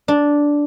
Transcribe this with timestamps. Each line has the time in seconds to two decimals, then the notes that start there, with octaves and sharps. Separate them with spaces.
0.08 D4